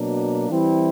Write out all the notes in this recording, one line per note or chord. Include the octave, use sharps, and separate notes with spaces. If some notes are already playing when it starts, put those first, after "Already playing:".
Already playing: B2 F#3 A#3 D4
E3 G3 C4 E4